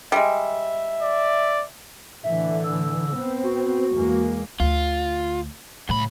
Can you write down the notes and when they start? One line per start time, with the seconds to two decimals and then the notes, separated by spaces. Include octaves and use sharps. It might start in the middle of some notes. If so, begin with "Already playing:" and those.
0.12 G3 G#3 E5
1.02 D5
2.24 A2 D3 E3 E5
2.64 E6
3.15 B3 C4
3.44 F#4
3.92 E2 G#3 A#3
4.60 D2 F4
5.89 C#2 A2 B5